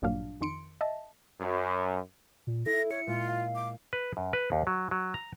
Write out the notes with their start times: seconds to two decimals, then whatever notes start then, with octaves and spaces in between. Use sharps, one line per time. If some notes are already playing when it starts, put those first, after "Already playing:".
0.02 A1 G2 A#2 F#3 D4 F5
0.41 F2 D#3 C6 C#7 D7
0.81 D#5 E5 A5
1.40 F#2
2.47 A#2
2.66 E4 A4 A#6
2.91 C#5 C#7
3.07 A#2 G#3 F4
3.28 F5
3.55 D6
3.93 B4
4.17 F#2
4.33 B4
4.52 D#2
4.67 F#3
4.91 F#3
5.14 A#5